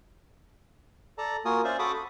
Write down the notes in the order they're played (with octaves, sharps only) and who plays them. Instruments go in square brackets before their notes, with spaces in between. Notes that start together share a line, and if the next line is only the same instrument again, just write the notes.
[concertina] A4 D5 A5 A#5
A#3 F4 F#4 A#4 G#5 D#6
C#4 C5 D5 E5 F5
F#4 A4 A5 B5 D6 D#6
B5